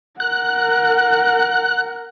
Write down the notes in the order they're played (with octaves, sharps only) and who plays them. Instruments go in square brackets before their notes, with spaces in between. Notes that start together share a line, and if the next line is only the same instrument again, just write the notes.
[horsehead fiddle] A#4 F#5 [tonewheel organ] F#6